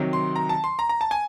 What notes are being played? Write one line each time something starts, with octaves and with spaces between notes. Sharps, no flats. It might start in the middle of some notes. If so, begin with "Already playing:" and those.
Already playing: C3 D#3 F#3
C6
A#5
A5
C6
A#5
A#5
A5
G#5